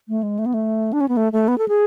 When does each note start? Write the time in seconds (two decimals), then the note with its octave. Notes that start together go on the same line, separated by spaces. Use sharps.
0.09 A3
0.23 G#3
0.39 A3
0.46 B3
0.54 A3
0.93 D4
1.01 C#4
1.09 B3
1.17 A3
1.33 A3
1.48 B3
1.58 A4
1.68 G#4